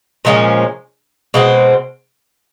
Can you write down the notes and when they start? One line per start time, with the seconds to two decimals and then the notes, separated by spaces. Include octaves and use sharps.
0.25 A#2 F3 G#3 C#4
1.34 B2 G#3 C4